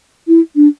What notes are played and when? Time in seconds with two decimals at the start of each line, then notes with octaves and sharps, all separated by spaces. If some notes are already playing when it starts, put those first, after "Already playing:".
0.28 E4
0.56 D4